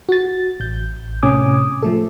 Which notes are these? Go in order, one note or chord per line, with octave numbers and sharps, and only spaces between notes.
F#4 A6
A1 G6
A2 C3 C#4 G#5 D6 D#6
F3 A3 A4